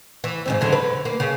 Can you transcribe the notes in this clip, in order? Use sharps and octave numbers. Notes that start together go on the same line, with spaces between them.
E3
G#2 C#3 C4
E2 D3 F#3
B4
A#3
C#3